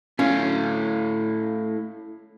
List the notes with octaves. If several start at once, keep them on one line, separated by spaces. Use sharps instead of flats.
A3 C#4 E4 F5